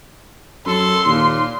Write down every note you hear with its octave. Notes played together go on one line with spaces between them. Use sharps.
F#2 A4 C6
D#2 A#2